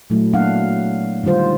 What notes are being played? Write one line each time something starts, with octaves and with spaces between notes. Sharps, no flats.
A#2 F#3 A3 E4
F#3 A#3 B3 D4 F5 F#5
D3 D#3 G3 F4 C5